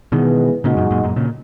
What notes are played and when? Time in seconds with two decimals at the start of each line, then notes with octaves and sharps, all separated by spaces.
0.12 B2 D#3 E3 G#3 B3
0.64 A#2 C#3 G#3 D#4 F#4
0.77 F#2 A#2
0.91 F#2 A#2
1.03 F#2 A#2
1.16 A#2 C#3